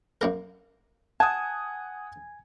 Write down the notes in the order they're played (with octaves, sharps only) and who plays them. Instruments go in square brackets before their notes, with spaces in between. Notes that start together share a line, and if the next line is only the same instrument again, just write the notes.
[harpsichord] F#2 A#3 A#4
[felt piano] F#5 D#6 [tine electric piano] G#5 G#6 [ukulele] A5